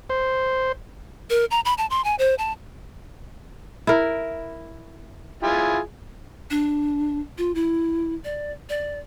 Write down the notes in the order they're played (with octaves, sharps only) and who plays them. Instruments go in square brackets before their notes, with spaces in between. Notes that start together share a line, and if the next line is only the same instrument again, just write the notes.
[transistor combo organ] C5
[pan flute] A#4
A#5
B5
A5
C6
G#5
C5
A5
[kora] E4 A#4
[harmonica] E4 F4 G#4
[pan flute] D4
F4
E4
D5
D5